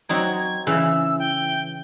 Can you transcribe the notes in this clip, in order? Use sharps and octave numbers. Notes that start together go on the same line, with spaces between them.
F#3 C4 D#4 G#6
G#6
C#3 E3 E6
G5